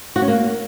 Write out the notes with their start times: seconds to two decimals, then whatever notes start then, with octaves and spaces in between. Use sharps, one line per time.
0.16 F#4
0.22 C#4
0.28 A#3